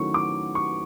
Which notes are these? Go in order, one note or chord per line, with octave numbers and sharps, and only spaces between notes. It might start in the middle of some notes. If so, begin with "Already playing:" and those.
Already playing: D#3 F#3 A3 C#4 E4 C#6
D6
C#6